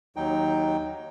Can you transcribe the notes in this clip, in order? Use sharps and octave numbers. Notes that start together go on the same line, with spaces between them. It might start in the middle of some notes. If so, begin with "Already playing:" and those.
D#2 F#3 D#4 G5